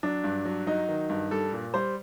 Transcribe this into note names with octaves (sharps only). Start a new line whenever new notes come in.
F#3 D4
G2
F#3
F#3 D#4
D#3
G2
G3 A4
A#2
G3 C5